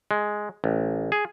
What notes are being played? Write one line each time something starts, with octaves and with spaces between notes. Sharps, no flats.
G#3
A1
G#4